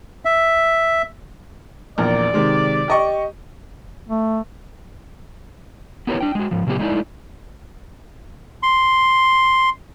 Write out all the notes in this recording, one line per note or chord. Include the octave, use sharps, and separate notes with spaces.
E5
A#1 E2 A#4 D5
C3 D#3 G#3
G4 D#5 C#6
A3
B3 E4 G4 A#4 B4 C#5
D4 G5
G#3 F#4
G#2 F3
A#2 C#3 F#3 B3 G4 G#4
G#3 A3 D#4 E4 D5
C6